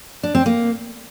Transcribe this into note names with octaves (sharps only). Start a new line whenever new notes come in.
D4
C4
A#3